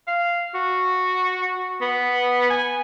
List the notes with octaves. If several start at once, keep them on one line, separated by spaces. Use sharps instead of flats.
F5
F#4
B3
G#5